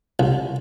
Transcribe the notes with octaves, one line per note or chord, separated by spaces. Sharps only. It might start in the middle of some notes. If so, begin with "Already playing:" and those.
C2